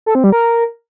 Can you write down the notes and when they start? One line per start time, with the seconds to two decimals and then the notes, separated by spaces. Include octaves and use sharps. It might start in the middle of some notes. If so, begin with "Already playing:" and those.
0.06 A4
0.15 C4
0.24 G3
0.32 A#4